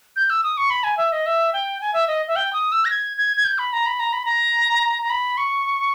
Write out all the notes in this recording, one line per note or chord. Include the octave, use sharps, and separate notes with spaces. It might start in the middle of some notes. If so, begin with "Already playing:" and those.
G6
E6
D#6
C#6
B5
G#5
E5
D#5
E5
G5
G#5
E5
D#5
E5
G5
D#6
E6
A#6
G#6
G#6
G#6
G6
B5
A#5
B5
A#5
B5
A#5
A#5
B5
C#6